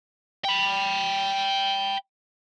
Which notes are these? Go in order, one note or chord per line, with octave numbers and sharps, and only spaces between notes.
G5 B5